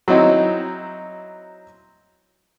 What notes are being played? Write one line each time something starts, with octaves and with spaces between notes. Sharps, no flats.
F#3 C4 D#4 E4